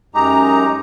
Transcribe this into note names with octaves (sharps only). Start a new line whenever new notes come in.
F#2 G#3 D#4 G4 A#5